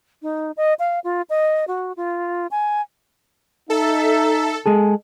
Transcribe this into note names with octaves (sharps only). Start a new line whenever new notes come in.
D#4
D#5
F5
F4
D#5
F#4
F4
G#5
D#4 A4 E5
G#3 G#4 A4